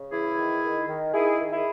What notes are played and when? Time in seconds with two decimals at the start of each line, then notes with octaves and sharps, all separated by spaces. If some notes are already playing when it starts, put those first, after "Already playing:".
Already playing: C#3
0.12 E3 E4 G#4
0.37 D#3
0.63 D#3
0.89 D#3
1.14 D#3 E4 G#4
1.40 D#3
1.53 E4 G#4